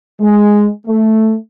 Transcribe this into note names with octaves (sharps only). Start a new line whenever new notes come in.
G#3
A3